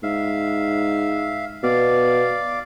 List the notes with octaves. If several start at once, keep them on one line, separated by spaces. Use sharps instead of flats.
G#2 E5 F5
B2 D5 F5